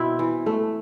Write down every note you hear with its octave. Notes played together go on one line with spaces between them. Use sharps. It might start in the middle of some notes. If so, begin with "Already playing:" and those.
Already playing: B2 C4 E4
E3
A3